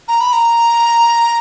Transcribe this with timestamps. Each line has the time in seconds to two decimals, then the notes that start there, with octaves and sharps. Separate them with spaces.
0.08 A#5
0.21 B5
0.33 A#5